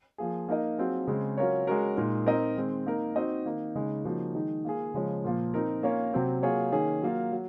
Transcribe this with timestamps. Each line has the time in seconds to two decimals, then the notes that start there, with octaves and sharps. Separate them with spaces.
0.18 F3 A#3 F4 G#4
0.48 A#3 D#4 A#4 D#5
0.78 F#3 C4 F4 G#4
1.07 C#3 G#3 C4
1.38 F#3 C#4 F4 A#4 C#5
1.67 G#3 C#4 F#4 A#4
1.97 A#2 G#3 D#4
2.26 C4 D#4 A#4 D#5
2.56 D#3 G#3 C4
2.86 A#3 D#4 A#4
3.16 C4 D#4 F#4 C5 D#5
3.45 D#3 A#3 D#4 A#4
3.75 C#3 G#3 D#4
4.05 C#3 F3 A#3 D#4 F#4
4.35 D#3 G#3 D#4
4.65 A#3 F4 G#4
4.94 C#3 F3 G#3 C#4
5.24 A#2 F3 A#3
5.54 C4 D#4 A#4
5.83 A#3 C#4 F4 A#4 C#5
6.13 C3 F#3 C4
6.43 F#3 A#3 F4 G#4 C#5
6.72 D#3 A#3 C#4 G#4
7.02 F#3 A#3 F4
7.32 F#3